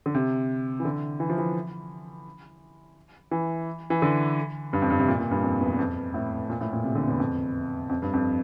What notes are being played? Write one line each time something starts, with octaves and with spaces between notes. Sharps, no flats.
D3
C3
E3
D3
E3
F3
E3
E3
E3
D3
G2
F2
G2
C3
A#2
A#2
G2
F2
E2
F2
A2
A#2
A2
A#2
C3
D3
E2
F2
F2
G2
F2